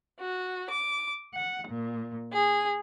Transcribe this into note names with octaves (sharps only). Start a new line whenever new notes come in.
F#4
D6
F#5
A#2
G#4